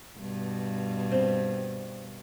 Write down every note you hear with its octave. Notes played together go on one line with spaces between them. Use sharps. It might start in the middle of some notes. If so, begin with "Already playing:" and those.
G2 B2
C4